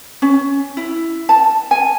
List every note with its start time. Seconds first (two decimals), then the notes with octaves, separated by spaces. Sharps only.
0.22 C#4
0.77 E4
1.29 A5
1.71 G#5